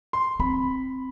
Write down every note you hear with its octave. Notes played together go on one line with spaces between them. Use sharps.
C6
C4 B5